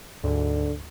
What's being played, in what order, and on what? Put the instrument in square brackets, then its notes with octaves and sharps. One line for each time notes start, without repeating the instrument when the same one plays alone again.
[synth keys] D2 G#2 [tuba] D3